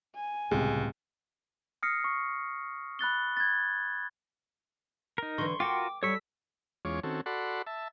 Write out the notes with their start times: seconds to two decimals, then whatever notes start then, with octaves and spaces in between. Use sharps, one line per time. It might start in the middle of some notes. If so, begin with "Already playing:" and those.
0.15 G#5
0.51 C#2 A2 C3 G3 G#3 B3
1.83 D#6 F6 A#6 C7 C#7
2.04 C#6
2.99 B5 F#6 A6 G7
3.37 G#6 A6
5.18 D#4 A#4
5.38 D3 E3 C6 C#6
5.60 F4 F#4 A#4 G5 D6
6.03 G3 A4 C#5 C#6 E6 B6
6.85 E2 G#3 C#4 F4 C#5 D6
7.03 D#3 C4 C#4 F#4 A4
7.26 F#4 A4 D5 F#5 B5 C6
7.67 E5 A5